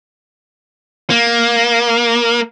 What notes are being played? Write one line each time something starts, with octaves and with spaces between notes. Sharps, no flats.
A#3